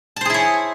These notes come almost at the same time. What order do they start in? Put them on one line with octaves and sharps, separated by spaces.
A5 C5 G#4 E4 C#5